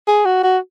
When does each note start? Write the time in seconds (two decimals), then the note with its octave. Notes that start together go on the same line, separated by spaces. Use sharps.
0.08 G#4
0.26 F#4
0.44 F#4